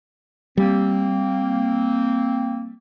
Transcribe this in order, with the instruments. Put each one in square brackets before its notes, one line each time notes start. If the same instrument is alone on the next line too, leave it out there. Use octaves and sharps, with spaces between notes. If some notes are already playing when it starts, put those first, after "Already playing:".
[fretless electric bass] G3 [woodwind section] A#3 C4